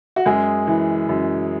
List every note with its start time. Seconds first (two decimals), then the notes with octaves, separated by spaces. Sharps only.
0.16 F#4
0.26 F#2 G#3 G#4
0.67 E3
1.09 F#2